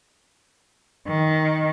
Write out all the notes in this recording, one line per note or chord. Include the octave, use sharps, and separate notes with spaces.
D#3